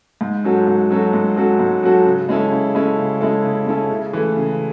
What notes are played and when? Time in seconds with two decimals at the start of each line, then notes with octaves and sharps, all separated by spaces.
0.21 G#2
0.44 F#3 C#4 F#4 A4
0.67 G#2
0.90 F#3 C#4 F#4 A4
1.13 G#2
1.36 F#3 C#4 F#4 A4
1.59 G#2
1.83 F#3 C#4 F#4 A4
2.06 C#3
2.29 G#3 C#4 E4 A4
2.52 C#3
2.75 G#3 C#4 E4 A4
2.98 C#3
3.21 G#3 C#4 E4 A4
3.44 C#3
3.67 G#3 C#4 E4 A4
3.90 C#3
4.13 E3 A3
4.36 C#3